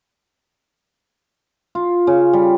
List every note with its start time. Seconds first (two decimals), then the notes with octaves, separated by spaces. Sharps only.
1.75 F4
2.07 C#3
2.33 G3